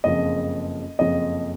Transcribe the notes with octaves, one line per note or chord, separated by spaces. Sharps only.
F#1 F2 C#3 F3 D#5
F#1 F2 C#3 F3 D#5